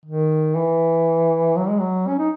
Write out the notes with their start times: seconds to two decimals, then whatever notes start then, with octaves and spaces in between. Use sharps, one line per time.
0.05 D#3
0.55 E3
1.57 F#3
1.69 G#3
1.79 F#3
2.08 C#4
2.18 D#4